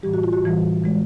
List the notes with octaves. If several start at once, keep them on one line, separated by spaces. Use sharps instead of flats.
A2 E3 G3 G4
F#4
F4
F#4
A2 E3 G3
E3 G#3